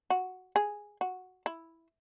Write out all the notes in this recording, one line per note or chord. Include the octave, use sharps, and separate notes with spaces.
F#4
G#4
F#4
E4